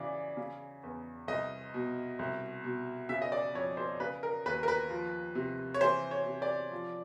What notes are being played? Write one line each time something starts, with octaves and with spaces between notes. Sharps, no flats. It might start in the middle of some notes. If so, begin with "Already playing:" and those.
Already playing: C#3 E3 D5
C#3
E2
C2 D#5
B2
C2
B2
C#3 E5
D#5
D5
F2 C#5
C5
C#3 B4
A#4
D#2 B4
A#4
B4
F3
C3
C#5
E3 C5
C#5
C3
D5
F3